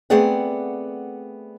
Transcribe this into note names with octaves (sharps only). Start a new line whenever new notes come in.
A3 B3 C4 G#4 D5 F#5